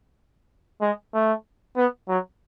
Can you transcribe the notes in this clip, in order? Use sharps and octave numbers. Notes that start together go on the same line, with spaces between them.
G#3
A3
B3
F#3